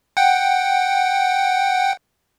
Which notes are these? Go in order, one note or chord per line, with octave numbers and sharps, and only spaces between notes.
F#5 G5